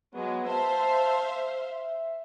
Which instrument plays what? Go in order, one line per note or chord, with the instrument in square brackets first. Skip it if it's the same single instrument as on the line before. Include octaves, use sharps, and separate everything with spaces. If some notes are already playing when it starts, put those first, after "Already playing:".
[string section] F#3 G#3 [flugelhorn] B3
[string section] C5 E5 F5 [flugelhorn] A5
[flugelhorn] E5